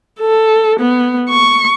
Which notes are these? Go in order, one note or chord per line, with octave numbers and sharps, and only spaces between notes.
A4
B3
C#6